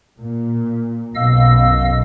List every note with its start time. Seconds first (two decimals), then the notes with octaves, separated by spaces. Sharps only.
0.19 A#2
1.15 B1 F#2 B2 D#5 F5 E6